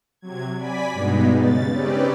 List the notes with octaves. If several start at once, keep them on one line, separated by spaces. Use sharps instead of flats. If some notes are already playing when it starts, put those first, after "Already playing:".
C3 F#3 G#6
D5 G#5 B5 B6
G2 B2 G#3 B3 D#4
C#3 A6
C4 C#4 D#4 G4 B4 D5